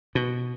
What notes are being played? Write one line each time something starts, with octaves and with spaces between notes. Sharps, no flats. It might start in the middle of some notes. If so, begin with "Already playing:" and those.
B2